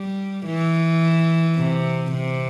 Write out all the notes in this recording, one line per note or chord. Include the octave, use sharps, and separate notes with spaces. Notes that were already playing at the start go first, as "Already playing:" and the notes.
Already playing: G3
E3
C3
C3